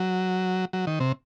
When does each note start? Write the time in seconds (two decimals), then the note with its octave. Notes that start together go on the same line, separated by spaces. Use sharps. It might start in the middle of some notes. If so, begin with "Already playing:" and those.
Already playing: F#3
0.73 F#3
0.87 D#3
1.00 C3